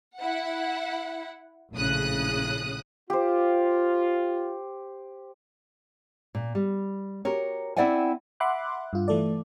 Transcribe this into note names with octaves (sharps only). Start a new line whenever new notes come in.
E4 F#5
A#1 A2 C#3 D#6 F#6
F4 G4 C5
A#2
G3
F#4 G4 A#4 C#5
C4 E4 D5 E5 F#5 G#5
E5 F#5 B5 C6 D6 F#6
G2 F4
E3 A3 A4 D5